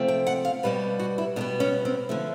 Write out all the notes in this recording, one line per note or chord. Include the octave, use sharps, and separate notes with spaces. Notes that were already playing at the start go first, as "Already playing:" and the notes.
Already playing: C3 F3 A3 C4
G5
F#5
F5
B2 G3 B3 B4
F#4
E4
B2 G3 B3 D4
C#4
C4
D3 F3 A3